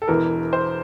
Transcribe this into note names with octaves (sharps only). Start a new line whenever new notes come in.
A4
E1 E2 E3 A#4
C5